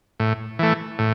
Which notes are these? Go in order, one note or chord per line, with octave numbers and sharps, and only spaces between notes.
A2
E3 A3
A2